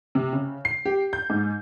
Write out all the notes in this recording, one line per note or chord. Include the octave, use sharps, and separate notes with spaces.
C3
C#3
C7
G4
G6
G#2